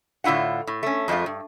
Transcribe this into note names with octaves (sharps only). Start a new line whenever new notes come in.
A2 D3 E4 F4 F#5
A2
A3 C#4
F2 F3 G#3 A3 F4
G2